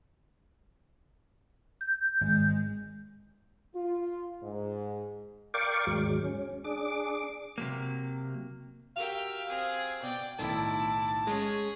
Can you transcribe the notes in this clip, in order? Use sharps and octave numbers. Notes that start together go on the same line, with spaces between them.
G6
G#1 G#3
F4
G#2
A#4 D5 F5 G5 C#6 D6
D#2 G#2 F#3 G#3
C#4
D4 G#4 D6
C3 F#3 A#3
F#4 G4 A#4 E5 F5 G5
C4 G#4
B2 D5 G5
B1 A2 D#3 E4 A5 D6
G#3 C#4 G#4